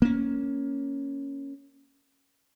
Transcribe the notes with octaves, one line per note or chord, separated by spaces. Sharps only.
A#3 C#4